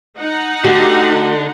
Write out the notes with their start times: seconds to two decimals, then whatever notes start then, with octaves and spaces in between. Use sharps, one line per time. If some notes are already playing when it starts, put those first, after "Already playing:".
0.18 D#4 F#5
0.64 D3 A3 F#4 G4